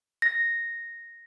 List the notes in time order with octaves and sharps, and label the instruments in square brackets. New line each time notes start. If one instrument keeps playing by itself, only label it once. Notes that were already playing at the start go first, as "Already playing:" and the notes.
[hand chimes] A#6